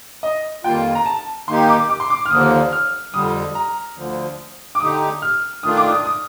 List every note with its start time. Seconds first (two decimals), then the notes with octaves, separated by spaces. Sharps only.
0.23 D#5
0.64 F2 D#3 G3 A#3 F4 G5
0.95 A#5
1.06 A5
1.48 D#3 A#3 D#4 G4 C6
1.69 D6
1.89 D6
2.00 C6
2.10 D6
2.25 F6
2.31 D#2 D3 F3 A#3 D#6
2.72 F6
3.14 F2 D3 G3 D#6
3.55 A#5
3.97 D2 D3 F3
4.75 D6
4.80 D3 A3 D#4 G4 D#6
5.22 F6
5.63 D#3 A3 D4 F4 D#6
5.77 D6
5.91 D#6
6.05 D#6